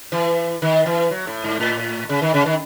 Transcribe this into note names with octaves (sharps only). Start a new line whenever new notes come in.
E3
D#3
E3
F#3
A2
G#2
A2
C#3
D#3
C#3
D#3